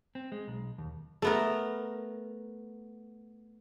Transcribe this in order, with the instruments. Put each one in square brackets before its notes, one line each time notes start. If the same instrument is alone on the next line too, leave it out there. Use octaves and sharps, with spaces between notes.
[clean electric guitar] C4
G#3
B1
D#2
[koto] A3 B3 A#4